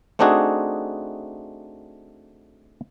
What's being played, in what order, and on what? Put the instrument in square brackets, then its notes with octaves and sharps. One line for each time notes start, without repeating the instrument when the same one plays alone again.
[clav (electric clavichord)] A3 C4 D4 D#4 F#4 G#4